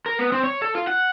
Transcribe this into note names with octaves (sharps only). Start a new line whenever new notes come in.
A#4
B3
C4
C#5
A4
F4
F#5